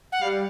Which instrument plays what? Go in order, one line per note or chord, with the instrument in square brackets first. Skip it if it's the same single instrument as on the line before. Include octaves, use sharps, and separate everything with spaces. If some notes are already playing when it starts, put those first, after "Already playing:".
[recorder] F#5
[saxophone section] G3 [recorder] F5